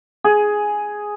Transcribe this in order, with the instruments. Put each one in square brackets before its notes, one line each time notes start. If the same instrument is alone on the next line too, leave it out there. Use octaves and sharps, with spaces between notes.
[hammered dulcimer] G#4